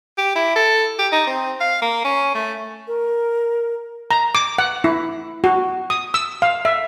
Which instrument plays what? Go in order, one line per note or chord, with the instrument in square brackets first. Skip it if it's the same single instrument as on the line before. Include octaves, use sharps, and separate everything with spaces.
[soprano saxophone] G4
E4
A4
G4
D#4
C4
F5
A#3
C#4
A3
[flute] A#4
[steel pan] A#5
D6
F#5
E4
F#4
D#6
E6
F5
E5